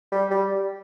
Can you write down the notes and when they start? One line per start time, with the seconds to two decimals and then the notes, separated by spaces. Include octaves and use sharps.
0.12 G3
0.31 G3